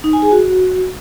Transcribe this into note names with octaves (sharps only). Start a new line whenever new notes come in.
D#4
G#5
G#4
F#4